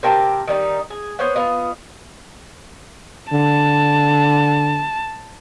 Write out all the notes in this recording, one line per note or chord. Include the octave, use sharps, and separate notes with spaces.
C3 A#4 G5 A5
D#3 G3 D#4
G#4
B3 C5 C#5 F#5
B3 F4 D#5
D3 A5